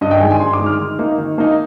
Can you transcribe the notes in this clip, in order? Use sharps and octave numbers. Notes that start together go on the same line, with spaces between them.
G2 D#5
G5
D#3 G#3 G#5
G#5
G2 C6
D6
D#3 G#3
F6
D#3
A#3 D#4
D#3
A#3 D#4